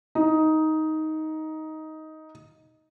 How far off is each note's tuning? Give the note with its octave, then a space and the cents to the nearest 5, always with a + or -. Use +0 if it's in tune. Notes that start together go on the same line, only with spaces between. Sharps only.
D#4 +10